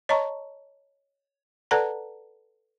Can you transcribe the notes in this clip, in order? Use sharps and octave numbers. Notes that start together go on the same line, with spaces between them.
C#5 D#5 A5 A#5 C#6
A4 B4 D5 F#5 A5 A#5